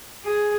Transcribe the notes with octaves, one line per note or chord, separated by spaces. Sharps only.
G#4